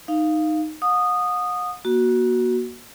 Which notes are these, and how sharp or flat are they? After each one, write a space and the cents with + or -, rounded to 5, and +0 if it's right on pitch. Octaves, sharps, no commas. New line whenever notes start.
D#4 -5 F5 -5
F#5 -45 D#6 -15
A#3 +35 F#4 +0